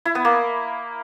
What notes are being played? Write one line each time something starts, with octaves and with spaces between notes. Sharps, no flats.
E4
B3
A#3